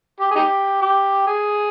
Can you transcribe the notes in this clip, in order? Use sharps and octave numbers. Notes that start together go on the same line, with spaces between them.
G4
G#4
D#4 G4
G4
G#4